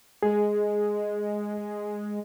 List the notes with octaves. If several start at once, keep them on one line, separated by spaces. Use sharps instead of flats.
G#3 G#4